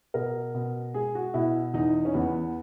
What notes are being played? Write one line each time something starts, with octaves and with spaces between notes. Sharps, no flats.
B2 A#4
B2
G#3 G#4
F#4
B2 E4
E2 D#4
C#4
E2 B3